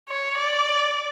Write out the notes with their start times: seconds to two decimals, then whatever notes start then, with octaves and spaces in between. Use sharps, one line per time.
0.09 C#5
0.38 D5